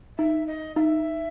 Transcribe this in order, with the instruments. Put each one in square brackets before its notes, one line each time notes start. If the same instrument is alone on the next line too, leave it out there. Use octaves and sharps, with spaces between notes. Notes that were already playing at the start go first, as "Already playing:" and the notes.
[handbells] D#4 [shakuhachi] E5
[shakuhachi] D#5
[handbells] D#4 [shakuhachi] E5 F5